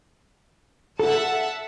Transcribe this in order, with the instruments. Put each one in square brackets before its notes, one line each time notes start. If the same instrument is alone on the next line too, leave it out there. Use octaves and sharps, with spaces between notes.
[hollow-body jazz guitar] A4 [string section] E5 F#5 A5